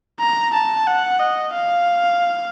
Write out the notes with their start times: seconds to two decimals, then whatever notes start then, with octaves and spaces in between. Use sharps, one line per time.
0.20 A#5
0.54 A5
0.87 F#5
1.20 D#5
1.54 F5